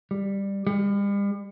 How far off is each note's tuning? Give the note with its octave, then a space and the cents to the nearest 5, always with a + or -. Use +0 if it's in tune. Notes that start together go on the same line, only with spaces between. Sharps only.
G3 +15
G3 +40